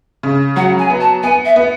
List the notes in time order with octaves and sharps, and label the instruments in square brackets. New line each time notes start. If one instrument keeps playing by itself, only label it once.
[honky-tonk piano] C#3
[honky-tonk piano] F#3 [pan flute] F#5
[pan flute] G#5
[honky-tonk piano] B3
[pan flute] A5
[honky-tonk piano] B3 [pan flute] G#5
[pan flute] E5
[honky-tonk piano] B3